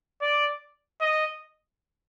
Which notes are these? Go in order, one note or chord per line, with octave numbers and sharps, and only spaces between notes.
D5
D#5